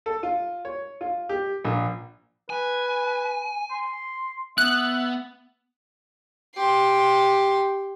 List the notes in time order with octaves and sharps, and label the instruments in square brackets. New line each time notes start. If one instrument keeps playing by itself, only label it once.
[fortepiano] A4
F4
C#5
F4
G4
A#1
[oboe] B4 [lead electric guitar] G#5
[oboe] C6
[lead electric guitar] B3 [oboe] E5 [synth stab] F#6
[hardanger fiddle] G4 C6